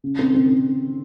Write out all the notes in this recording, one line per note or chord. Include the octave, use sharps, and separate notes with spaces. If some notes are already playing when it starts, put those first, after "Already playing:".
C#3
C4
C4